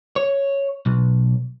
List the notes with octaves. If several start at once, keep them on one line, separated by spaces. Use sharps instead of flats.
C#5
B1